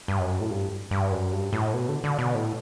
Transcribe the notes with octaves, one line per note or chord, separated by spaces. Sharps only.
G2
F#2
A2
G2
G2
F#2
G2
A2
B2
D3
D3
B2
A2